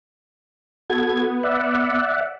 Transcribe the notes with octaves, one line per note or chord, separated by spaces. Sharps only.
B3 F#4 A4 G#6
D5 E5 F#5